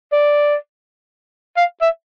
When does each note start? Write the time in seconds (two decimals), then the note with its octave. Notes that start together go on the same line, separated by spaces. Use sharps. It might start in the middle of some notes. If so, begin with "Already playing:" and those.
0.12 D5
1.57 F5
1.81 E5